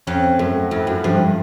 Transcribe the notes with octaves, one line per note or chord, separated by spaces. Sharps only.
F2 C#4
F#2 A3
F2 E4
F#2
G2 F3